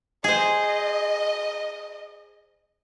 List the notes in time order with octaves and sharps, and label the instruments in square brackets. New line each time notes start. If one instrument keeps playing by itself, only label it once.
[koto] G#4 C5 [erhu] D#5